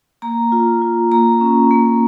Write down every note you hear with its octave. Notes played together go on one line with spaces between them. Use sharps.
A#3 A#5
F4
F4
A#3 A#5
C#4
A#3